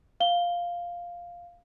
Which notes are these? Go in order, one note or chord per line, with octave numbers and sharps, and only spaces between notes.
F5 G7